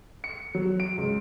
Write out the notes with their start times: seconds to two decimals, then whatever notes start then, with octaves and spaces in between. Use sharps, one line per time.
0.24 C#7
0.55 F#3
0.80 D7
0.98 C#2